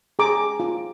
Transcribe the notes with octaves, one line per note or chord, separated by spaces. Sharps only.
G#4 A#5 D6
F4